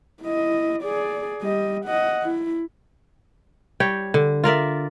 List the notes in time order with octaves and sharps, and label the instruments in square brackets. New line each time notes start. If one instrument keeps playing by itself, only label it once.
[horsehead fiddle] E4 D#5
G#4 D5
G3 D#5
D#5 F#5
E4
[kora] G3 C#5 G5
D3
F4 A#4 D5 E5